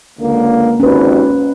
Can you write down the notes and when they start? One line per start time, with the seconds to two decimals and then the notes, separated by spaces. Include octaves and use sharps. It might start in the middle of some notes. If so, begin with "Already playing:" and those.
0.19 C#2 D3 A#3
0.80 G#1 D#2 C#4 B4